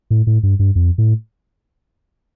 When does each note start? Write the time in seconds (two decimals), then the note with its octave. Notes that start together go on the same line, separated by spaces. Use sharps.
0.11 A2
0.27 A2
0.43 G2
0.59 G2
0.75 F2
0.98 A2